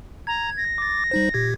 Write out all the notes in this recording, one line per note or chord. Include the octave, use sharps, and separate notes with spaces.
A#5 G#6
A#6
D6 A6
G3 D#4 C5
A#2 G4 G#6